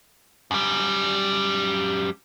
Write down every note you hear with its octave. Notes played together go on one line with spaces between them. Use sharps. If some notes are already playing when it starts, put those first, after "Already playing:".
F#2 G3